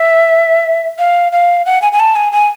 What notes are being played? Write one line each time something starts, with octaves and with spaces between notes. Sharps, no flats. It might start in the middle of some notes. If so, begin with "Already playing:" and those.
Already playing: E5
F5
F5
F#5
G#5
G#5
A5
G#5
G#5